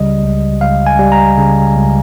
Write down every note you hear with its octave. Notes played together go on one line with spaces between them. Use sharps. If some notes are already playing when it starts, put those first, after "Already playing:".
Already playing: C#2 C#3 G3 D#5
C#2
C#2 F5
G#5
G3
A#5
C#3
C#2